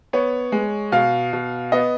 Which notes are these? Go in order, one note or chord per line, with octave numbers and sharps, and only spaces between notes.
B3 C#5
G#3
B2 F5
B2
B3 D#5